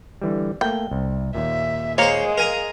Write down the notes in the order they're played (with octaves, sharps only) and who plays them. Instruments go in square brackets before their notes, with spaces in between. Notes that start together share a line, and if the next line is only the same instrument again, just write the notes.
[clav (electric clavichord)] D3 E3 G3
[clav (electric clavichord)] A3 A#3 [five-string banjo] G5
[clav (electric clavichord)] C2
[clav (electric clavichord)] D#2 A#2 [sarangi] E5
[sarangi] G#3 [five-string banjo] A#3 [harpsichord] C5 C#5
[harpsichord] A#4 G#5 A#5 [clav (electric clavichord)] F5